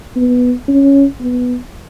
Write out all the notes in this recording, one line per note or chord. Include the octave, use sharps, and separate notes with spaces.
B3
C#4
B3